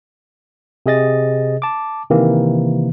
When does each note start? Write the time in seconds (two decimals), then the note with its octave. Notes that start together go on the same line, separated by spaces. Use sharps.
0.86 C3 G#4 D#5 A6
1.62 A5 D6
2.10 C3 D#3 E3 A#3